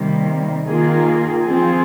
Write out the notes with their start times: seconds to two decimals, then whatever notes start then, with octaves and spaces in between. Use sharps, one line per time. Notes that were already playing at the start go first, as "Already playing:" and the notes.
Already playing: C3 D#3 G3 A#3
0.66 D#3 A#3 F4 G#4
1.43 F3 C4 F4 G#4